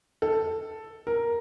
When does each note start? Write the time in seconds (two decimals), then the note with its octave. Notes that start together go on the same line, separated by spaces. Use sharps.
0.22 A4
1.07 A#4